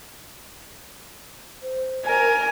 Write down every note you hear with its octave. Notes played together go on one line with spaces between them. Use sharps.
C5
A#4 G#5